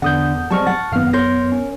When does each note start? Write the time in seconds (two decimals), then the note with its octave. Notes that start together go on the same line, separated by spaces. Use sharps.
0.02 E2 D3 F#5 D#6 G6
0.51 G3 G#3 C4 A5 C#6 F6
0.67 F#5 A6
0.92 G#1 F#2 B3 F5 F6
1.13 A#4 C#5 C6 G6 A#6
1.52 C#4